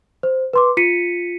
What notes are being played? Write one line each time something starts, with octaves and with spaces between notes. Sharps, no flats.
C5
B4 C6 D6
F4 B6 C#7 D#7